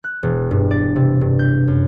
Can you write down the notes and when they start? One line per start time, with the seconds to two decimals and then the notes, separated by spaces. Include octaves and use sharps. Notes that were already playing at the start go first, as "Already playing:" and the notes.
0.04 F#6
0.23 E1
0.51 G2
0.71 D5
0.96 C3
1.21 G2
1.39 G6
1.68 F#2